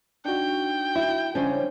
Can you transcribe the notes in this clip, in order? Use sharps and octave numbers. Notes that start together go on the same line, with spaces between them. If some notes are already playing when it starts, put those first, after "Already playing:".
D4 D#4 F#4 G5
E4
C#3 G3 C#4 D4 C5 C#5